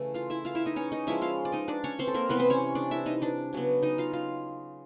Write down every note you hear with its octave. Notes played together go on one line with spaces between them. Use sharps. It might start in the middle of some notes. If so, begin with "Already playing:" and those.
Already playing: C#3 E3 A3
F4 F5
E4 E5
F4 F5
E4 E5
D#4 D#5
C#4 C#5
D#4 D#5
F3 G#3 C#4 E4 E5
F4 F5
D5
D#4 D#5
D4 D5
C#4 C#5
C4 C5
A4
A#3 A#4
C3 E3 G3 B3 B4
C4 C5
C#4 C#5
D4 D5
E4 E5
D#4 D#5
D4 D5
C#3 F#3 B3
D#4 D#5
F4 F5
F4 F5